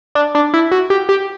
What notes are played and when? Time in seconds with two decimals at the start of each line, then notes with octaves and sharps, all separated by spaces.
0.15 D4
0.35 D4
0.54 E4
0.72 F#4
0.90 G4
1.09 G4